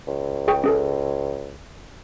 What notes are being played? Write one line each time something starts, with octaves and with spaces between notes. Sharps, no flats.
C#2
G#4 G5 C#6
C#4 G#4 A4